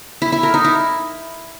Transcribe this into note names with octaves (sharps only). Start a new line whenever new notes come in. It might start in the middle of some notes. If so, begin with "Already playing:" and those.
E4
E4
A#4
D#4
E4